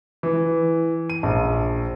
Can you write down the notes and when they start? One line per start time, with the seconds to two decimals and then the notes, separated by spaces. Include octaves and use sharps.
0.23 E3
1.10 D#7
1.23 A#1